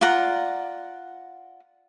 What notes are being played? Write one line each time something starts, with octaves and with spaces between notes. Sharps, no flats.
F4 D5 F#5 A#5